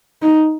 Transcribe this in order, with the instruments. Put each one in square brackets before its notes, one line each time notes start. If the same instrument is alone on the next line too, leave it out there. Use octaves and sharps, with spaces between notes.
[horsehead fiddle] D#4